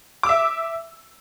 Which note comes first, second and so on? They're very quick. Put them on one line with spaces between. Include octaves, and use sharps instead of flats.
D6 E6 E5